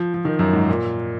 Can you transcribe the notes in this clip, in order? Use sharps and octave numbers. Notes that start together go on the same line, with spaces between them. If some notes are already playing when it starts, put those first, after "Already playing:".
Already playing: F3
F3
D#3
F#2
G#2
A#2